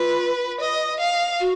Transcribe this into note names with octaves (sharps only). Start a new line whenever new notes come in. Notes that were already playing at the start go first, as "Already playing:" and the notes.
Already playing: F4 B4
D#5
F5
F#4